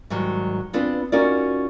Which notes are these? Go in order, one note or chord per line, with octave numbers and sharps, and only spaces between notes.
G#2 D#3 F#3 G3
B3 C4 D4 F4 G#4 B4
C#4 D#4 F4 F#4 A#4 D5